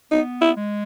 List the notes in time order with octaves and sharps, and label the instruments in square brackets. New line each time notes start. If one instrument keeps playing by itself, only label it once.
[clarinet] B3 [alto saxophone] D#4
[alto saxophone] E4
[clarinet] G#3